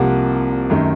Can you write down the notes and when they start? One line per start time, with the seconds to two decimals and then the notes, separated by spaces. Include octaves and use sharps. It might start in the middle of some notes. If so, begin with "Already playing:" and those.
Already playing: C2 C3 F3 A#3 F#5
0.70 F#2 D#3 A3